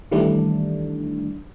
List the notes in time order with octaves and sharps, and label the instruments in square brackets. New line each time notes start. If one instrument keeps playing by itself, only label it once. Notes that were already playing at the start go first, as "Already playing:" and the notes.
[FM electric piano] D#3 E3 G3 A3 D4